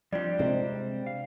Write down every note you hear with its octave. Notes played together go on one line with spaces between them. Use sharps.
F2 F3 G3 D4 G4 D5
C3 G#3 C4
F5